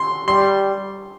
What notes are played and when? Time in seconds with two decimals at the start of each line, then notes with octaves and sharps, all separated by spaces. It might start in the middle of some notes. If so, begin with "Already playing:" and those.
Already playing: C6
0.27 G3 C6